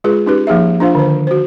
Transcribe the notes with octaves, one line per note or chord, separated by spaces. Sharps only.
G#3 F4 G#4 B4
C#4 D#4 G4 B4
F3 A#3 D#4 G#4 E5
D4 F4 C5 F5
D3 D#3 C5
F#4 C5